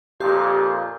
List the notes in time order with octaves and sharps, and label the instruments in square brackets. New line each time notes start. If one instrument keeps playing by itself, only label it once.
[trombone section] F2 A#2 [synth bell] G4 G6